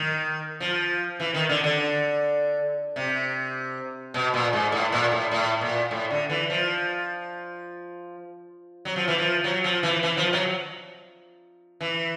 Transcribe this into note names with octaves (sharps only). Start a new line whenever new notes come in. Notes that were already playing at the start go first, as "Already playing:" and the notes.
Already playing: D#3
F3
E3
D#3
D3
D3
C3
B2
A#2
G#2
A2
A#2
A2
A2
A#2
A2
D3
E3
F3
F#3
F3
E3
F3
F#3
F3
E3
E3
F3
F#3
E3